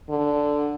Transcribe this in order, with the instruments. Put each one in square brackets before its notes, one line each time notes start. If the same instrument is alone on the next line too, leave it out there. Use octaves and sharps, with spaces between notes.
[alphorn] D3